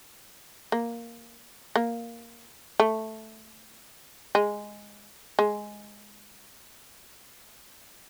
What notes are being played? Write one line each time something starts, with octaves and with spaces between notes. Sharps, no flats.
A#3
A#3
A3
G#3
G#3